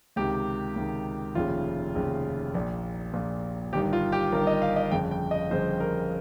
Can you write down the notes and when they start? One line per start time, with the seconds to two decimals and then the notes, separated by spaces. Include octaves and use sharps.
0.16 C#2 C3 D#3 G4
0.76 C#2 C3 D#3
1.35 F1 D#2 C#3 F4
1.95 F1 D#2 C#3
2.54 A#1 A#2
3.14 A#1 A#2
3.73 G1 G2 D#3 G4
3.93 F4
4.12 G4
4.32 G1 G2 D#3 A#4
4.47 D#5
4.62 F5
4.76 D#5
4.91 G1 F2 C#3 G5
5.11 G5
5.31 D#5
5.51 G1 F2 C#3 C5
5.80 A#4